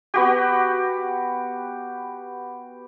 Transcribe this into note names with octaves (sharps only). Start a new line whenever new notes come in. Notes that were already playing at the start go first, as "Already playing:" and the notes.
B3 F#4 G4